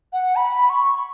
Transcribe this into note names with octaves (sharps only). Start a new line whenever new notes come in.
F#5
B5
C#6